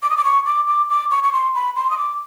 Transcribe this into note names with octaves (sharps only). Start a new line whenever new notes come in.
D6
D#6
D6
C#6
D6
D6
D6
C#6
C#6
C6
B5
C6
D#6
D6